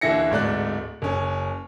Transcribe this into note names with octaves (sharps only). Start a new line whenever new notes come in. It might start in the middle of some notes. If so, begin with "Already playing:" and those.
D#2 D3 E3 E4 A#6 C#7
D1 G#2 A3 D5 F#6
F#1 C#4